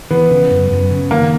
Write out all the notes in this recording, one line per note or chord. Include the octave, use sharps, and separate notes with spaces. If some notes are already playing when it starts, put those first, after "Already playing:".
E3 B3
C#3
F#2
F#2
C#3
D#3 A#3